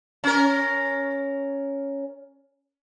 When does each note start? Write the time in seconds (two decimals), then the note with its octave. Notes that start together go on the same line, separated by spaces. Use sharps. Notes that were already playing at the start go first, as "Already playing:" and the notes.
0.24 C#4 A#4